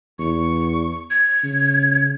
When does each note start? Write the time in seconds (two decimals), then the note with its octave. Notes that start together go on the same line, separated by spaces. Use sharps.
0.19 E2 C#6
1.10 G#6
1.43 C#3